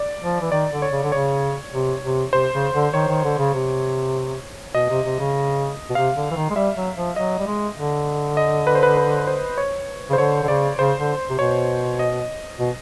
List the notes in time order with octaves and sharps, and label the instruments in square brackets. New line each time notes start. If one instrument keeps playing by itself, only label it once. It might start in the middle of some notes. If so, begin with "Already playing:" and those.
Already playing: [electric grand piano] D5
[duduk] F3
E3
[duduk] D#3 [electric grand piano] D5
[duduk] D3
[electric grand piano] C#5
[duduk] C#3
D3
[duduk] C#3 [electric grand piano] C#5
[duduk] C3
C3
[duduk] C3 [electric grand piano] C5
[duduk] C#3
D3
[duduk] D#3 [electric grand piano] C#5
[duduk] D#3
D3
C#3
C3
[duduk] B2 [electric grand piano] D#5
[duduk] C3
C3
C#3
B2
[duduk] C3 [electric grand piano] F5
[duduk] D3
E3
D#3
G#3
[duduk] G3 [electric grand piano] E5
[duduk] F#3
F3
[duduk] F#3 [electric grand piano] D#5
[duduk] G3
G#3
D3
[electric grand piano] D#5
B4
C5
B4
B4
C5
C#5
[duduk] C#3
[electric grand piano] C5
[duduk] D3 [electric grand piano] C#5
[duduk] D3
[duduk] C#3 [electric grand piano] D5
[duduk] C#3 [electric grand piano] C5
[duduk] D3
C3
[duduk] B2 [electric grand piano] C#5
[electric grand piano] D#5
[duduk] B2